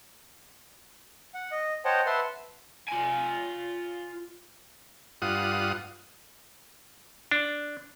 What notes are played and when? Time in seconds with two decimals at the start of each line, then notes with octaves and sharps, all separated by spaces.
1.34 F#5
1.52 D#5
1.85 C5 C#5 D#5 F#5 G5 A5
2.06 B4 E5 F#5 A5 C6
2.88 F4 G#5
5.22 G2 F4 F#5 D#6
7.31 D4